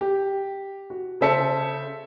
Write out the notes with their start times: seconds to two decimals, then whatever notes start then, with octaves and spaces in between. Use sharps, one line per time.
0.01 G4
0.90 F#4
1.21 C#3 A4 C5 E5 A5 C#7